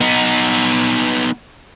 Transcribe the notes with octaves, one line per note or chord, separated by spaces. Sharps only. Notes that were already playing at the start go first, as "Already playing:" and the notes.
B3 D#4